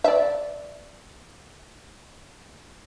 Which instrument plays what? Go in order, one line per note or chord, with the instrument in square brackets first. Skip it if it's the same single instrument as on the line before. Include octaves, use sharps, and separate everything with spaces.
[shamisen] D5 E5